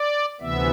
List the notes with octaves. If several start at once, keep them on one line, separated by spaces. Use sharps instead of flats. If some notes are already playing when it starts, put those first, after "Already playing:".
Already playing: D5
D2 C3 E3 B3 E5